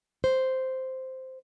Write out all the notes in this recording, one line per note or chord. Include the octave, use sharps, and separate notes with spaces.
C5